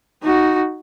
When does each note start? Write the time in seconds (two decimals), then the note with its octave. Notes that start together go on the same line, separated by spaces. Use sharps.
0.22 D#4 F#4